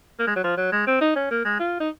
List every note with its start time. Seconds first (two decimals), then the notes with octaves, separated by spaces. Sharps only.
0.19 A#3
0.27 G#3
0.36 F#3
0.44 F3
0.57 F#3
0.72 G#3
0.87 C4
1.01 D#4
1.16 C#4
1.31 A#3
1.45 G#3
1.59 F4
1.80 D#4